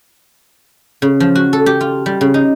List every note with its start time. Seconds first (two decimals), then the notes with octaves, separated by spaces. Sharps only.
1.02 C#3
1.20 F3
1.35 F#4
1.53 A4
1.66 G4
1.81 F4
2.06 G3
2.21 C#3
2.34 D#4